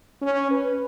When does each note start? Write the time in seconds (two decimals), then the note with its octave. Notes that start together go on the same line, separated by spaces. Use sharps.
0.22 C#4
0.51 B4